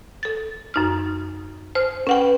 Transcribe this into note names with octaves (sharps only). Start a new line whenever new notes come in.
A4 A6
F#2 D#4 F6
C5 F6
C#4 B4 F#5 G5